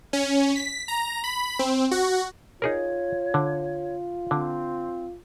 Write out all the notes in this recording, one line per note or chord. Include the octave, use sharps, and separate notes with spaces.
C#4
B6
A#5
B5
C4
F#4
D#4 F4 G#4 A#4 C#5
D3
D3 C4